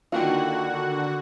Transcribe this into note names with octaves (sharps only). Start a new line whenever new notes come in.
D3 D#3 A#3 F4 F#4 F#5